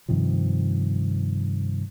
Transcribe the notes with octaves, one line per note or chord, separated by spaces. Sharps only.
G2 C3 D#3 F3